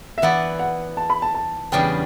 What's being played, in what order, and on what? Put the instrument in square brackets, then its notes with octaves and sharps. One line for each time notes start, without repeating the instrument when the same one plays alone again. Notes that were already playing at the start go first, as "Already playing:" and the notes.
[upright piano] E5
[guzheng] E3 B3 E4 B4 D5 [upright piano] F#5
[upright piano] F#5
A5
B5
A5
A5
[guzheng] E2 C#3 G3 B3 D4 [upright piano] G5